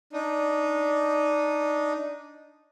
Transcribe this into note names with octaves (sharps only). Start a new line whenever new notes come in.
D4 D#4